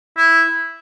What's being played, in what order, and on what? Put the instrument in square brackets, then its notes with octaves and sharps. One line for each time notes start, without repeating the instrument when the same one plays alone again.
[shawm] E4